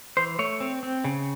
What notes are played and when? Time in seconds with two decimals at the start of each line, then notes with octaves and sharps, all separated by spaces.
0.17 E3 C5
0.39 A3 C#5
0.60 C4
0.83 C4
1.04 C#3